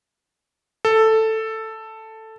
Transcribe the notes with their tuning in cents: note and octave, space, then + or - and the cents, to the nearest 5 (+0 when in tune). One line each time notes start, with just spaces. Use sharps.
A4 +5